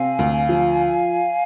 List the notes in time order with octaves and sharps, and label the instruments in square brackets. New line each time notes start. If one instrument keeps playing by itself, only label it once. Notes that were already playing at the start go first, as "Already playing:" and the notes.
Already playing: [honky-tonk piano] C3 C4 [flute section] F5 G#5
[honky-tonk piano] D2
F3